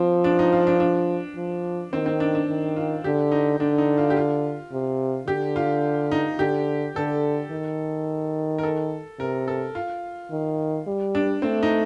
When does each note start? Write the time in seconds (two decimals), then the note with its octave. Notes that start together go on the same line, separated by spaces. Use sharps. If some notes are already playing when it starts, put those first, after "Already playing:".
Already playing: F3 C4
0.24 D4
0.39 D#4
0.52 F4
0.67 D4
0.80 D4
1.36 F3
1.92 D#3 C4
2.06 C4
2.20 D4
2.35 D4
2.48 D#3
2.76 F4
3.04 D3 G4
3.32 D#4
3.60 D3 D4
3.78 D#4
3.98 F4
4.10 G4
4.16 F4
4.72 C3
5.27 D3 G4
5.56 F4
6.12 D#4
6.39 D3 G4
6.96 D3 A4
7.51 D#3
8.58 A#4
8.63 A4
9.19 C3 A#4
9.48 A4
9.75 F4
10.31 D#3
10.87 G3
11.15 D4
11.42 A3 C4
11.63 D#4